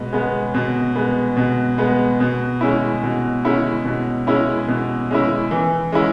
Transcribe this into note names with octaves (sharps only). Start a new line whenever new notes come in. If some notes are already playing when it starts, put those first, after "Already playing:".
Already playing: B2 G#3 B3
G#3 B3
B2
G#3 B3
B2
G#3 B3
B2
G#3 C#4 E4
B2
G#3 C#4 E4
B2
G#3 C#4 E4
B2
G#3 C#4 E4
E3
G#3 C#4 E4